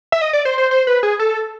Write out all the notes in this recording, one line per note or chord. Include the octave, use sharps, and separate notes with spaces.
E5
D#5
D5
C5
C5
C5
B4
G#4
A4